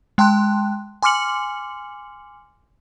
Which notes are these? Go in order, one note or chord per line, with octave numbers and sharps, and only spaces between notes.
G#3 G5 A5 C6 F#6
G#5 C6 D6 F6 C#7 F#7